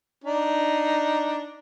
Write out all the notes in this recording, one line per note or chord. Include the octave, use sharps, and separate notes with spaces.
D4 D#4